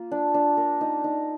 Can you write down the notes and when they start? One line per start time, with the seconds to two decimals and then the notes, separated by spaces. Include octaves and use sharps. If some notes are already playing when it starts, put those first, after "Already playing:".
Already playing: A#3 F4
0.12 D4
0.34 D4
0.57 A#4
0.81 D#4
1.04 D#4